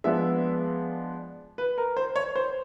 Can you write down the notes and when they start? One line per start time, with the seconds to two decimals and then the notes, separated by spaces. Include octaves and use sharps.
0.04 F3 G#3 B3 D4 E5
1.58 B4
1.78 A#4
1.97 C5
2.16 C#5
2.36 C5